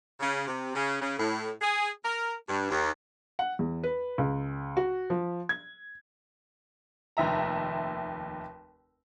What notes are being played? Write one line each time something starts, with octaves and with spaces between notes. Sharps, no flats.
C#3
C3
C#3
C#3
A2
G#4
A#4
G2
D#2
F#5
E2
B4
C#2
F#4
F3
G#6
F1 D#2 E5 A#5